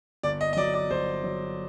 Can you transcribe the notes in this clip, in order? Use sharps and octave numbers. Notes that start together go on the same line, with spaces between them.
G1 D5
D#5
D#5
F#3 D5
D5
G1 C5
F#3